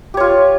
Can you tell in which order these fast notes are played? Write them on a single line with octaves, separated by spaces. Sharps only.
G4 C#5 F4